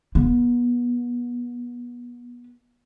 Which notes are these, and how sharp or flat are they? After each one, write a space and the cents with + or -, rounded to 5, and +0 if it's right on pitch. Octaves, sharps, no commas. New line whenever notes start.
B3 -30